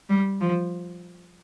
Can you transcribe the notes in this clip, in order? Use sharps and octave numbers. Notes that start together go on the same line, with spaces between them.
G3
F3